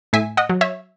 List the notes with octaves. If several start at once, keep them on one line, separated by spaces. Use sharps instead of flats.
A2 E5 G#5
D#5 F#5
F#3
C#5 E5